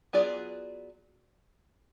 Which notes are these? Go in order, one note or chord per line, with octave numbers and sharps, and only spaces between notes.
F#3 B3 F4 G#4 D5